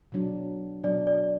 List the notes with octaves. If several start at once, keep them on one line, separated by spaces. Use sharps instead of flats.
B2 F#3 D4
B2 F#3 D4 D5
D5